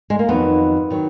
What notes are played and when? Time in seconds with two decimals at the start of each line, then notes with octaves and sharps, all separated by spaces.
0.10 G#3
0.19 A#3
0.28 F2 D#3 F#3 B3
0.91 D#3 F#3